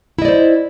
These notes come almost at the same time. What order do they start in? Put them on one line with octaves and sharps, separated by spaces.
E4 D#5 D5 C5